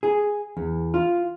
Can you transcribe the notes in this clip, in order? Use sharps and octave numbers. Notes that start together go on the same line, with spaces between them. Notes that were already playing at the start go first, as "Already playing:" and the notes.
G#4
E2
F4